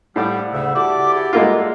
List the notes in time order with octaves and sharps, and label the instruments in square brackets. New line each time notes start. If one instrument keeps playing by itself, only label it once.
[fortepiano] A2 [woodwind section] G3 [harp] C5 D5 F5 [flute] F#5
[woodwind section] D2 C#3 E5
[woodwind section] E4 G4 D5 [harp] F#4 A4 F#5 [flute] D6
[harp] G#4 [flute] F#5
[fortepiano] G#3 A#3 F4
[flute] A4